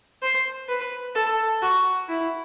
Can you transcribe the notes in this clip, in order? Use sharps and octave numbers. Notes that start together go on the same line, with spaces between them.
C5
B4
A4
F#4
E4